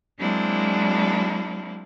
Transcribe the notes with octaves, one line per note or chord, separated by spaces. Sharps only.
F#3 G#3 A#3 C4 D4 E4